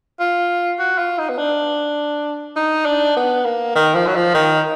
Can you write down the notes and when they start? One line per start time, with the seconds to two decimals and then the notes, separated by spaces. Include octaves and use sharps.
0.20 F4
0.79 F#4
0.98 F4
1.18 D#4
1.29 B3
1.38 D4
2.56 D#4
2.86 D4
3.16 B3
3.45 A#3
3.75 D#3
3.95 F3
4.07 F#3
4.15 F3
4.34 D#3